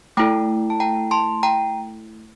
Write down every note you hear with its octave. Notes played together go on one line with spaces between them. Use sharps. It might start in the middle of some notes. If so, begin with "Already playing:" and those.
A3 E4 A4 G5 A#5
A5
G5 A#5
A5 C6
G5 A#5